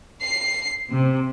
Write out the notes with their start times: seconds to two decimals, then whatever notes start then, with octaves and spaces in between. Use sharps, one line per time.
0.22 C7
0.89 C3